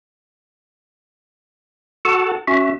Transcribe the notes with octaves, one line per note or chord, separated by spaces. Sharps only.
F#4 A4 F#5 A5
C#4 F#4 E5